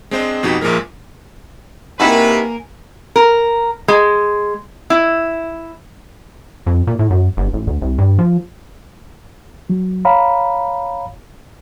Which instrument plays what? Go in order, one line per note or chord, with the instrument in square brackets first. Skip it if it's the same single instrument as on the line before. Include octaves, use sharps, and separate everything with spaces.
[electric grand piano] G#3 C4 D4 C5 D#5
F2 B2 D#4 F#4 G4 B6
A#1 A#2 F3 G#3 A#4
[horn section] C3 B4 [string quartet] A#3 A#4 G#5 [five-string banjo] D#4 E4 F#4
[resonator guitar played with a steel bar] A#4
G#3
E4
[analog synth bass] F2
A#2
A2
F#2
G1
A1
D2
C2
G2
F3
[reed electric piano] F#3
C#5 F5 A#5 B5